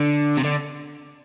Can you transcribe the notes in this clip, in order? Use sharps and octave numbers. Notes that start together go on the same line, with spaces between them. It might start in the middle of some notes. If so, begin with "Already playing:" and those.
Already playing: D3
C3
D3